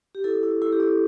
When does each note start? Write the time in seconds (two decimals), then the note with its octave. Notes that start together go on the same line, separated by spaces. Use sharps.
0.15 G4
0.24 E4 A4
0.43 E4
0.62 E4 A4
0.72 G4
0.80 E4 A4